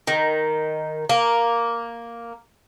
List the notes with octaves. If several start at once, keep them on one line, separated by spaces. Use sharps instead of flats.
D#3
A#3